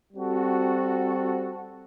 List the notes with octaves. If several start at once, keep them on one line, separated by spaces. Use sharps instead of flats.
G3 C4 F#4 A4